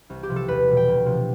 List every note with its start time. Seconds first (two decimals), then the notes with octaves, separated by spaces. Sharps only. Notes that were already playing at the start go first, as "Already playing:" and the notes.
0.10 C2
0.23 G4
0.29 C3 F3
0.36 A4
0.48 E2 B4
0.67 B2 G3 B3
0.77 G5
0.87 D2
1.06 C3 F3